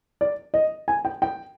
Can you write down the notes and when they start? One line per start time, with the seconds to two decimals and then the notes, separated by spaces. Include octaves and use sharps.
0.21 D5
0.54 D#5
0.88 G#5
1.05 G5
1.22 G5